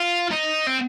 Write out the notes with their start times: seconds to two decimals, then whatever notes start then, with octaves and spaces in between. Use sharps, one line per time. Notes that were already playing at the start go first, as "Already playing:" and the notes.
Already playing: F4
0.31 D#4
0.67 C4